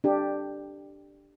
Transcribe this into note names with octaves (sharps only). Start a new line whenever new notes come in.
D4 G4